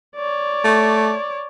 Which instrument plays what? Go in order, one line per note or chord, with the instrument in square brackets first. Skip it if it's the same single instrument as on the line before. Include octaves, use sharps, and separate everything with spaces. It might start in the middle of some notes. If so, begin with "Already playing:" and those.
[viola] C#5 D5
[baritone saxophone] A3